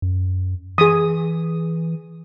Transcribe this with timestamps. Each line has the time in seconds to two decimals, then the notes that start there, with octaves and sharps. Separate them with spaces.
0.02 F#2
0.78 E3 G#4 D#6